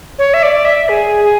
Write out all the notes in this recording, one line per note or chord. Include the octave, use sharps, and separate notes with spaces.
C#5
E5
D5
E5
G#4
G#4